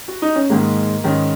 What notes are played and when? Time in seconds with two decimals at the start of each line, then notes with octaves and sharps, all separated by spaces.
0.08 F#4
0.22 D#4
0.36 C#4
0.50 G#2 D#3 G#3 A#3
1.04 G#2 D#3 G#3 C#4